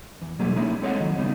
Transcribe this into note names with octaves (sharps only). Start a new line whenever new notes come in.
E2
B2 F#3 G3 A3 A#3 G#4
G#3 A#3 C#4 D#4 E4
C4 A4 C#5 D#5 F5 F#5
D#2 D#3 F#3
C#3 G3 B3 D#4